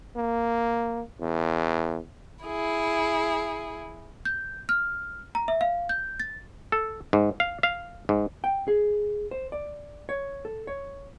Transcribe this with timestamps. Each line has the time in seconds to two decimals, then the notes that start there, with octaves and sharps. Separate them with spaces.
0.17 A#3
1.21 E2
2.43 E4 G#4
4.25 G6
4.69 F6
5.35 A#5
5.48 E5
5.61 F5
5.89 G6
6.20 A6
6.72 A4
7.13 G#2
7.40 F5
7.63 F5
8.09 G#2
8.44 G5
8.68 G#4
9.31 C5
9.52 D5
10.09 C#5
10.45 A4
10.67 C#5